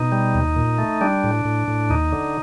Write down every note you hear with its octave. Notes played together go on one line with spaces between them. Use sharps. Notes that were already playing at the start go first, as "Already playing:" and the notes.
Already playing: B2 D#4
G3
D#2
A#2
A3
G3 D4
A2
A2
A2
D#2 D#4
D3